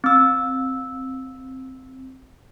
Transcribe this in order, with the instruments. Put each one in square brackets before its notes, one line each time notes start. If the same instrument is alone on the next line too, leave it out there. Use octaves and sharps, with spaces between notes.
[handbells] C4 E6